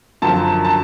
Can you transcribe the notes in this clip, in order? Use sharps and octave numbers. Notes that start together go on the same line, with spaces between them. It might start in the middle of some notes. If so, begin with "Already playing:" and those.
F#2 D3 F3 A5
A5